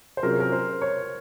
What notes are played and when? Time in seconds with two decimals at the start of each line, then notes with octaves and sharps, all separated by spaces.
0.17 C5
0.23 C3 F#3 C#4 F4 G#4 A#4
0.40 A#4
0.52 C5
0.82 C#5